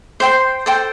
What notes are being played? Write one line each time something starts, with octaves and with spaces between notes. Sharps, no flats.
C5 G5 C6
A4 C5 G5